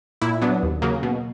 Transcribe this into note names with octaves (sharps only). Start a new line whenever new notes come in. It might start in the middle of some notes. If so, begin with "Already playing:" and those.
A#2 E4
F#3 B3 D4
D#2
C#3 F#3 A#3
B2